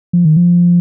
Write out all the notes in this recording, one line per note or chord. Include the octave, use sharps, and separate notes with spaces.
F3
D#3
F3